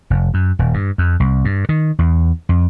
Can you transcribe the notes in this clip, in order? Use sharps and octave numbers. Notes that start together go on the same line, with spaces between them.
F1
F#2
D#1
G2
F2
C2
G2
D#3
E2
F2